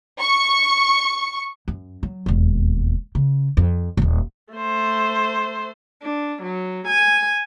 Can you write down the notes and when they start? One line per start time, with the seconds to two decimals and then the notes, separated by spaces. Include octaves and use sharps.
0.19 C#6
1.68 F#2
2.03 F#3
2.26 E1 D#2
3.15 C#3
3.57 F2
3.97 D#1 G#1
4.53 A3 C5
6.02 D4
6.42 F#3
6.88 G#5